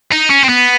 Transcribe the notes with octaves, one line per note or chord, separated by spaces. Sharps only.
D#4
C#4
C4
B3